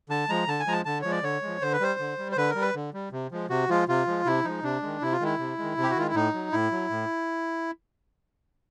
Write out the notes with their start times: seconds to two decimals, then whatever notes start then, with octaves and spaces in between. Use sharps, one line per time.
0.09 D3 A5
0.29 F3 G#3 A#5
0.47 D3 A5
0.60 G#5
0.67 F3 G#3 A#5
0.73 A5
0.85 D3 A5
1.01 F3 G#3 C#5
1.11 D5
1.23 D3 C#5
1.42 F3 G#3
1.61 D3 C5
1.73 B4
1.80 G3 C5
1.99 D3
2.18 G3
2.32 C5
2.37 D3 B4
2.50 A#4
2.55 G3
2.61 B4
2.75 D3
2.94 G3
3.12 C3
3.32 F3 G#3
3.50 C3 F#4
3.69 F3 G#3 F4
3.88 C3 F4
4.07 F3 G#3
4.25 C3 E4
4.44 F3 G#3 D#4
4.63 C3 D4
4.82 D#3 G#3
5.02 C3 E4
5.12 F4
5.20 D#3 G#3 E4
5.39 C3
5.59 D#3 G#3
5.77 C3
5.83 G4
5.90 F#4
5.96 D#3 G#3 F4
6.07 E4
6.14 A2 D#4
6.34 F#3
6.52 A2 E4
6.72 F#3
6.90 A2